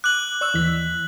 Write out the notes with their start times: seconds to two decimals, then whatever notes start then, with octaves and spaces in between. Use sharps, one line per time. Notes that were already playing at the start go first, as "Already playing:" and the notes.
0.04 D6 F#6 F#7
0.41 D5 C#6 E6
0.54 D#2 E3 B6